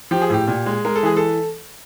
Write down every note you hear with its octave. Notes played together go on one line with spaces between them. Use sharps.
F3 G4
G#4
A2 G4
A#2
G#3
G#3 A#4
A4
E3 G#4
A4